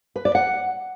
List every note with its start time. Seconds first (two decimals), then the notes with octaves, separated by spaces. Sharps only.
0.16 B4
0.25 D5
0.35 F#5